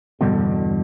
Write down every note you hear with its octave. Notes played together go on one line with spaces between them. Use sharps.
E2 G2 B2 D3